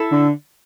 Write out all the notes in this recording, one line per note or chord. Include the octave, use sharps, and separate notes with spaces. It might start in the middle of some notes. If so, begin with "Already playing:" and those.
Already playing: E4 A4 E5
D3